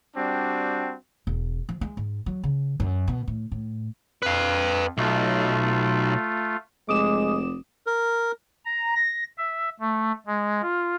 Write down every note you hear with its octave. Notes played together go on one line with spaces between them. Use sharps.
G3 C4 D4 F#4
E1
F3
G#3
G#2
F#3
C#3
F#2
B2
A2
A2
F2 B4 F5
B1 A3 F4
F1 G#3 D6 D#6 E7
A#4
A#5
A#6
E5
A3
G#3
F4